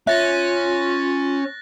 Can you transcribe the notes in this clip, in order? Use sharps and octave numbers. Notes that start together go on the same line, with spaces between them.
C#4 F4 E5 F#6 A6 A#6